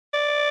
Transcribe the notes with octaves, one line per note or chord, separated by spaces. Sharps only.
D5